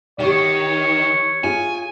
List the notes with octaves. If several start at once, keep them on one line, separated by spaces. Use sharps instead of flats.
D#3 G4 C#5 F#5
F4 G#4 G#5